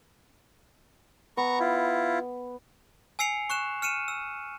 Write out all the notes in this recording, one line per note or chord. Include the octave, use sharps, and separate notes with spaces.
B3 A#5 C#6
E4 F4
G#5 E6 C7 C#7 F7
C#6 F#6 E7
F6 C#7 D#7 E7
E6